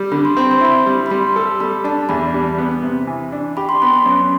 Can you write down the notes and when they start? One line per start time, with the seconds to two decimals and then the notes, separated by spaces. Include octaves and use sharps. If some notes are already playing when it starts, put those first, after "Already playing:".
Already playing: G3
0.12 D3 B5
0.25 C6
0.37 C4 B5
0.51 C6
0.61 E4 B5
0.86 G3
1.06 B5
1.11 G3 C6
1.36 A4
1.60 G3 B5
1.84 D4 A5
2.09 E2 B5
2.34 G3
2.58 B3
2.83 C3
3.07 E3
3.32 D4
3.57 G4 B5
3.69 C6
3.82 B3 B5
3.93 C6
4.06 F#2